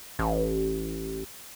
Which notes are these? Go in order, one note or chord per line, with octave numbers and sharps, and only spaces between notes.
A1